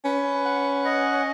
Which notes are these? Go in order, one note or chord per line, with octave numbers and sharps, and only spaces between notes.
C#4 B4
F#5
D#5